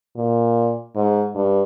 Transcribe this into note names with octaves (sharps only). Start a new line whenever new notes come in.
A#2
G#2
G2